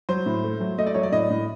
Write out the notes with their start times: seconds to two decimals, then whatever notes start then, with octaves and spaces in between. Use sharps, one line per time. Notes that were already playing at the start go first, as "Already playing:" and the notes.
0.09 F#3 C5
0.26 A2
0.44 A3
0.61 F#3
0.78 A3 D#5
0.87 D5
0.94 F#3 C#5
1.03 D5
1.12 A2 D#5
1.30 A2